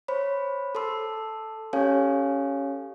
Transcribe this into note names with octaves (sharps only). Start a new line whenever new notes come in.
C5 C#5 B5
A4 A5 C6 E6
C#4 G4 A4 C#5 F5 G#5